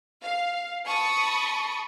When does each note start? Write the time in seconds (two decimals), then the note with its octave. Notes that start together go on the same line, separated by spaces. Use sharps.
0.22 F5
0.85 A5 B5 C#6 D#6